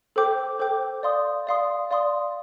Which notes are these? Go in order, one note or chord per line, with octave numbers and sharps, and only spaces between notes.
A4 C5 G5 D6 G6
A4 C5 G5 D6 G6
D5 F5 C6 D#6
D5 F5 C6 D#6
D5 F5 C6 D#6